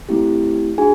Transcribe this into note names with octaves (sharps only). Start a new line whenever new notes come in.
A3 C4 E4 G4
D4 F#4 G#4 G#5